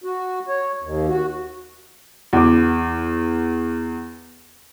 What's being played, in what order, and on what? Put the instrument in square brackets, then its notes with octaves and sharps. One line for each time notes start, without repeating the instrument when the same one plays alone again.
[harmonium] F#4
C#5
D#2
F#4
[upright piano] E2 D6